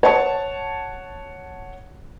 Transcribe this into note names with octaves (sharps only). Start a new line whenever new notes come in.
C#5 F#5 A5 C#6